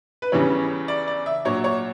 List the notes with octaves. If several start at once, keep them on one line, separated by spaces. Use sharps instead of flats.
B4
E2 C#3 E3 G3 C#5
D5
D5
E5
A#2 F#3 C#5
C#5